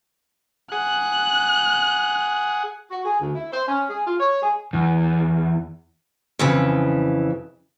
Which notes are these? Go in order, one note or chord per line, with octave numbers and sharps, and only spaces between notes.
G#4 F#5 F#6
F#4
G#4
D2
E4
C5
C#4
G#4
F4
C#5
G#4
E2
F2 C#3 E3